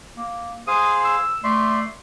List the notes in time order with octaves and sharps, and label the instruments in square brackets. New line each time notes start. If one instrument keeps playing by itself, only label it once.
[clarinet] A#3
[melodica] G#4 C5 F5 [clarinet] D#6
[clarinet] E6
[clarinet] A3 [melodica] D5 E5 [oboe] C6